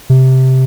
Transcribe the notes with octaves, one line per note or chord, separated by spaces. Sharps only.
C3